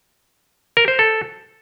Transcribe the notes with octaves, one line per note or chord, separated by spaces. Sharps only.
A#4
C5
A4